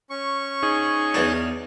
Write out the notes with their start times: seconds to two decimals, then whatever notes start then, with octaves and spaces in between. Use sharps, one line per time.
0.10 C#4 C#6
0.63 D#4 G#4
1.14 E2 D4